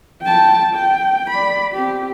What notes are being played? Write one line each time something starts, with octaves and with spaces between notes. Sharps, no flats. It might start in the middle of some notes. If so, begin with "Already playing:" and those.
G5 A5
G5
D5 B5
C4 G4